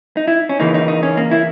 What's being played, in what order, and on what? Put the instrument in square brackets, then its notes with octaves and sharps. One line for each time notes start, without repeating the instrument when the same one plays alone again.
[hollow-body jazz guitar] D#4
E4
C#4
C#3 E3 A#3 D#4
D#4
D#4
C#4
A#3
E4